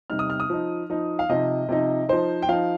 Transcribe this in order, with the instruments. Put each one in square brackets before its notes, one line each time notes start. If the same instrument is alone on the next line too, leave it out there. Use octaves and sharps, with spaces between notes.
[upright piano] C3 G3 D#4 F6
D#6
F6
D#6
F3 D#4
F3 D#4
F5
C3 F3 D#4 D#5
C3 F3 D#4
F3 D#4 C5
G5
F3 D#4 F5